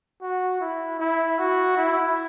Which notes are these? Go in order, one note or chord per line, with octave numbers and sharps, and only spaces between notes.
F#4
E4
E4
F#4
E4